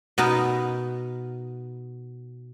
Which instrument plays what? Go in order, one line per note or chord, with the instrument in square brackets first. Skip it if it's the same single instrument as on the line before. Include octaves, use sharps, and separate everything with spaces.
[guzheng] B2 B3 D#4 A#4